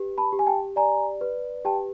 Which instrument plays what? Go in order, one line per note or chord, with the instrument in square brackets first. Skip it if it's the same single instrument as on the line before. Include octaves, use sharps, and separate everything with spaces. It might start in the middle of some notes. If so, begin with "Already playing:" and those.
Already playing: [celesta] G4 B4
A5 B5
G4
G#5
G5 A5
D5 G#5 A#5
B4
G4 G5 A5